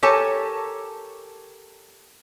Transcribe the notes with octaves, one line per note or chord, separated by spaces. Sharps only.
G4 A4 A#4 C#5 G#5 A5